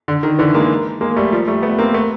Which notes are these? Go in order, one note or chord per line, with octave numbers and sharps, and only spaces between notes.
D3
D#3
D3 E3
G#3 A#3
G#3 A#3
A#3
G3 A3
F3 G3
G3 A3
A3 B3
A#3 C4
A3 B3